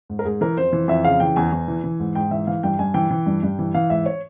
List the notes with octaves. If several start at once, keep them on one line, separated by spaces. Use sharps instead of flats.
G#2
A#4
G#2 G#4
E3 A#4
F2 C5
E3
F2 E5
C#3 F5
E3 G5
E2 G#5
E2
E3
E3
G#2
G#2 G5
E3 E5
E3 F5
G2 G5
G2 G#5
E3 G5
E3
G2
G2
E3
E3 F5
G#2 E5
C#5